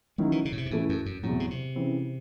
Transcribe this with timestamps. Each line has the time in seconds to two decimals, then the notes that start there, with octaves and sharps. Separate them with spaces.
0.18 D#3 F#3 G#3 C#4 E4
0.32 E3
0.45 C#3
0.52 A2
0.57 C3
0.66 G#2
0.71 A2 C#3 E3 A3
0.89 F#2
1.06 F#2
1.23 E2 A2 C3 F#3
1.40 C#3
1.51 C3
1.76 C#3 E3 C4